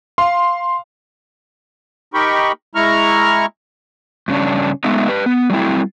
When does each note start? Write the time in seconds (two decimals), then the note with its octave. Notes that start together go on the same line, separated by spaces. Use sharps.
0.18 F5 C6
2.14 D#4 G4 A#4 G5 B5 C#6
2.75 G#3 E4 A#5 C#6 F6
4.28 G2 C#3 C#4 D4
4.84 G#3 A3 B3 D#4 E5
5.09 G4 B4
5.26 B3
5.50 F#3 G3 A3 C4 E4